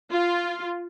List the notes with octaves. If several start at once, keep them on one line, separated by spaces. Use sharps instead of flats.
F4